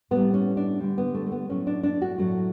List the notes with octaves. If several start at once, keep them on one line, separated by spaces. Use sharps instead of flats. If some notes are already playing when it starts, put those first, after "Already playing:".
A2 G3 B3
C#4
D4
D3 G3
B3
A3
A3
B3
A2 F#3 A3 C#4
D4
D4
F#4
A2 F#3 A3